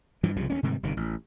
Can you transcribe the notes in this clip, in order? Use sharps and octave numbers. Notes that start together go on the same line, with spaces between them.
G2 E3 F3
C2 C#3 F3 G3
D2 A#3 C#4
G#2 C3 D#3 G3
G1 C3 D#3
A1